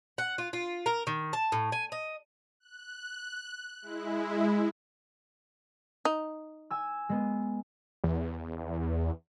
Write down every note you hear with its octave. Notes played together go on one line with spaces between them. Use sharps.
F#5
F4
F4
A#4
D#3
A5
A2
G#5
D#5
F#6
G#3 E4
D#4
G#5 E6
G#3 B3
E2